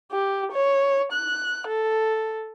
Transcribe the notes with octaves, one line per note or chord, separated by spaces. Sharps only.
G4
C#5
F#6
A4